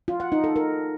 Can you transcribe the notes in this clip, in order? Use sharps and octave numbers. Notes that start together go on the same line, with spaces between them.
F4
F#5
D#4
A4
A#4